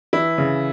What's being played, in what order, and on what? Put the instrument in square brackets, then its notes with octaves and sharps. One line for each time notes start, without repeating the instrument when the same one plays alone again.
[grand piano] E3 E4
C#3